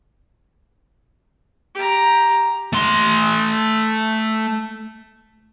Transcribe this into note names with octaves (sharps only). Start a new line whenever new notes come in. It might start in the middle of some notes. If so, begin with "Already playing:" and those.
G4 A#5
A3 C6